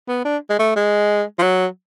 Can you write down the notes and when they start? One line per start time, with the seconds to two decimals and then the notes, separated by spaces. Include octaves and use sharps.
0.09 B3
0.25 D4
0.50 G#3
0.59 A3
0.76 G#3
1.39 F3
1.43 F#3